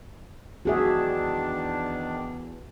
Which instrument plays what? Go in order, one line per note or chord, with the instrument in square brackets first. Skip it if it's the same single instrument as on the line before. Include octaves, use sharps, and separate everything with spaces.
[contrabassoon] E2 [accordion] D#3 D4 [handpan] F#4 G#4 E5